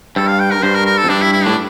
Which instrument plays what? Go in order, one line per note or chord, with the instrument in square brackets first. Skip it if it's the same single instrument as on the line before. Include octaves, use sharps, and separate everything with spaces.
[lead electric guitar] G2 [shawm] A4
[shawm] F5
G5
A#4
[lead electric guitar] G2 [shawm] C5
[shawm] A#4
A#4
A4
[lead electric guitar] F2
[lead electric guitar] G2 [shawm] D4
[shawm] E4
E4
[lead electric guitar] A2 [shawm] D4